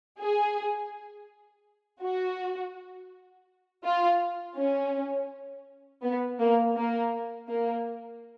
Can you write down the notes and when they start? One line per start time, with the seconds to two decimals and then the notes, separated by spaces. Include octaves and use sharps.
0.19 G#4
2.03 F#4
3.84 F4
4.57 C#4
6.02 B3
6.39 A#3
6.76 A#3
7.48 A#3